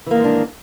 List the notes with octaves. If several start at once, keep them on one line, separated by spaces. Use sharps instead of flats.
G#2 D#3 E3 A#3 D4